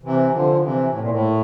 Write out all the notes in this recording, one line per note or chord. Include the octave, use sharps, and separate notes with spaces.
C3 E3
D3 F3
D3
C3 E3
A2
A#2
A2